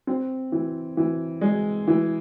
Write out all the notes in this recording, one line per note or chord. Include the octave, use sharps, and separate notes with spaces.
C4
E3
E3
G#3
E3